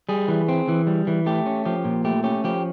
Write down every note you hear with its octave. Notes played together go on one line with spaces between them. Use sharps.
G3 G#4
E3
C4
E3
G3
E3
A3 G4
C#4
F3 G4
A#2
A3 G4
C#4 G4
F3 G4